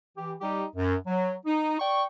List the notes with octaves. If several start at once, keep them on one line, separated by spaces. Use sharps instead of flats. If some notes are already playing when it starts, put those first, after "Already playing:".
E3 G4
G3 D#4 G4
F#2
F#3
D#4
D5 G5 C#6